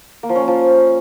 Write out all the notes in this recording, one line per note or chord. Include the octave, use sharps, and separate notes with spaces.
A#3
F3
C#4
A#3
F3